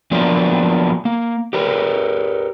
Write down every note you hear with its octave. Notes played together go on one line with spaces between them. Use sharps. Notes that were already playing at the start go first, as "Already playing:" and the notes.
F3 F#3 A#3 B3 D4
A#3
G4 A#4 B4